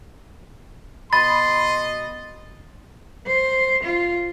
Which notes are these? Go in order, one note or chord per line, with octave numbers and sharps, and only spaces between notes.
B2 D#5 B5 C6 A6
C5
F4